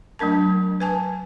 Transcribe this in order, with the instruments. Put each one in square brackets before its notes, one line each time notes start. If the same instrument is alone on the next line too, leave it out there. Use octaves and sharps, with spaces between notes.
[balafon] F#3 A3 D4 A#4 A5
B4 G#5 A5